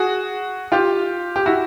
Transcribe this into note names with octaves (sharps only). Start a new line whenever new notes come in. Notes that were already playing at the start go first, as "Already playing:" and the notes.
Already playing: F#4 G#4
F4 G4
G4
E4 F#4